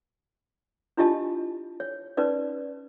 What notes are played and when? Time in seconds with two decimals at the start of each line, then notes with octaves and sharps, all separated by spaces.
0.97 D4 E4 F4 G4 D#5 A5
1.80 C#5
2.17 C#4 D#4 B4 D5